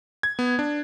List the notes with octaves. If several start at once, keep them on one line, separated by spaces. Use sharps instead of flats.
G#6
B3
D4